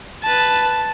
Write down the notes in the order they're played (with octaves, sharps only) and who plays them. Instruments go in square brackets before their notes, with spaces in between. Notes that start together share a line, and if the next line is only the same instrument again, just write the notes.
[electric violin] B4 A5